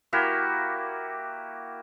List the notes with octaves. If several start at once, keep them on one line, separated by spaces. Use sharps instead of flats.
A#3 E4 F#4 G4